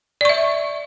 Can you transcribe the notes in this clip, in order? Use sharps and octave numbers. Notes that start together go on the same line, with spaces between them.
D5 E5 C#6